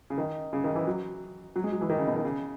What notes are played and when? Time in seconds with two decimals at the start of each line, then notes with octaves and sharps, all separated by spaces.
0.10 C#3
0.18 D#3
0.53 C#3
0.64 D#3
0.75 E3
0.87 F#3
1.56 F#3
1.64 G#3
1.72 F#3
1.81 E3
1.90 D#3
1.98 C#3
2.07 B2
2.16 D#3
2.25 C#3